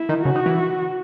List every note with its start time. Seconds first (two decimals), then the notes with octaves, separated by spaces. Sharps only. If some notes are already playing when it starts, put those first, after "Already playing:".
Already playing: E4
0.09 D#3
0.24 C#3 F#4
0.35 D#3
0.46 E3